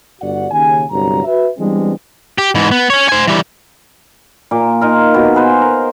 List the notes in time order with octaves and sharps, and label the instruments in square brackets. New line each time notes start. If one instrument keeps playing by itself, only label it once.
[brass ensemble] G1 G2 F#4 D5 F#5
D#2 C#3 G#5
G1 C2 G2 F#3 A#5
F#4 B4 E5
E3 G3 G#3 B3 C4 D4
[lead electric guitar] G4
G#2 E3
B3
C#4 C#5
C5 G#5
E3 G3
[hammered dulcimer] A#2 D6
D#4 F4 A#4
B2
G#4 B4 C5
A#4